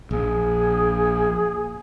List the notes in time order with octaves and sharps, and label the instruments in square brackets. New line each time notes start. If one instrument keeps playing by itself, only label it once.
[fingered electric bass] A#1 [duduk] G#4